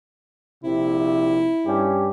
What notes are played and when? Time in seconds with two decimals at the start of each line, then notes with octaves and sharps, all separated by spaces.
0.64 A#1 C3 E4
1.67 G2 C#4 G4